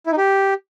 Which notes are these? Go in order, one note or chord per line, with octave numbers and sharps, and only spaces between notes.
E4
D#4
G4